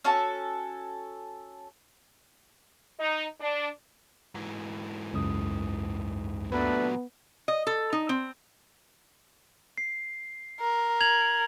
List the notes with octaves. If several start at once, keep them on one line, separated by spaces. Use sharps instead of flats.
C#4 F#4 A4 A5
D#4
D4
G#2 E3
C#2 F#2 D#6
A#2 F#3 A3 B3 D4 B4
D#5
A4
D#4
C4
C7
A#4
G#6 F7 F#7